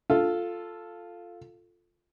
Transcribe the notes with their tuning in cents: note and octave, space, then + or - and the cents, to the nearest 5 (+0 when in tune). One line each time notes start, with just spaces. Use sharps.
F4 +0 A4 +0